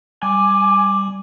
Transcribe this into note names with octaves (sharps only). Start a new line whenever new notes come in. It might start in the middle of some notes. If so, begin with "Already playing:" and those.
G3 G#5 D6